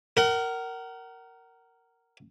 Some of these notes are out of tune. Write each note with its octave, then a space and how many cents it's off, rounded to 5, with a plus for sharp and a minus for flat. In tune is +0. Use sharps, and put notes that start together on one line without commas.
A#4 -5 F#5 +35